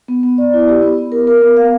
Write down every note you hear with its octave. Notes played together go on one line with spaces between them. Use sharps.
B3
B3
D5
E4
G4
B3
B3
A#4
A#4
B3
F5